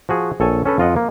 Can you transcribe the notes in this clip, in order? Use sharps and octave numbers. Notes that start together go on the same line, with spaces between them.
F3 F#4 G#4
A#1 A4 C#5 G#5
C#4 A4 B4
F2 F4 D#5 F#5
A#3